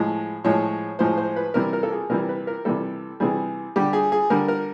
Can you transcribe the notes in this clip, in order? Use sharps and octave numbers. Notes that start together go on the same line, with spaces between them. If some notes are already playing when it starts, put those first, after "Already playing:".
Already playing: A2 F3 G#3
A2 F3 G#3 C#5
A2 F3 G#3 C5
C5
B4
C3 E3 G3 A#4
A#4
A4
G#4
C3 E3 G3 A#4
B4
A#4
C3 E3 G3 A4
C3 E3 G3 G#4
D3 G3 G4
G#4
G#4
D3 G3 A#4
A#4